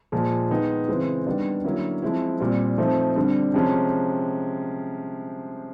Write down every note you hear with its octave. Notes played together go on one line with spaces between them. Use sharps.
A#2 F3 G#3
D#3 G#3 B3 D#4
C#3 E3 G#3 C4
D#3 G3 B3 D4
D3 F#3 A#3 C#4 E4
F3 G#3 C4 E4
A#2 G3 C4
F3 A3 C4 D#4
D3 G3 C4
C3 F3 G#3 C#4